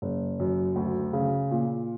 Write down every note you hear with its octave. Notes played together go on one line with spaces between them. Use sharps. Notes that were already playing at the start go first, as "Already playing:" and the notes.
F#1
F#2
D2
C#3
A#2